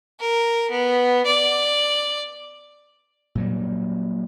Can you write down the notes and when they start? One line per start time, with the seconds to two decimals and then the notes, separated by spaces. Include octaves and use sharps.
0.20 A#4
0.71 B3
1.26 D5
3.35 A#2 F#3 G3